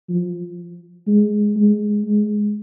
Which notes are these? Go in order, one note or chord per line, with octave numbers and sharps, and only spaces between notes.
F3
G#3
G#3
G#3